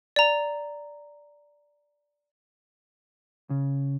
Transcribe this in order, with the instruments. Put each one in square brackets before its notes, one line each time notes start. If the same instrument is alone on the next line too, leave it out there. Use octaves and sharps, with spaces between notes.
[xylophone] D5 A#5
[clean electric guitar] C#3